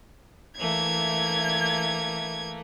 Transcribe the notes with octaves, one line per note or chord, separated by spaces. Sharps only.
E3 A3 A#3 G#6